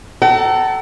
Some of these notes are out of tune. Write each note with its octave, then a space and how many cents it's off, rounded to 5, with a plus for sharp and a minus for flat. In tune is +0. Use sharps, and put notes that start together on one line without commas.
A4 +0 F#5 +45 A#5 -20